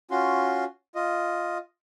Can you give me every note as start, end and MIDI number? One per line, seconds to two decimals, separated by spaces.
0.11 0.65 61
0.11 0.65 65
0.11 0.65 66
0.11 0.65 84
0.95 1.58 65
0.95 1.58 75